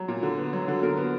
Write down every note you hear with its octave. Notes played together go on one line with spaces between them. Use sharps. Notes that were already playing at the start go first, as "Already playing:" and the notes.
Already playing: F#3
A#2
D3
B3
F#3
D3
D3 A#4
B3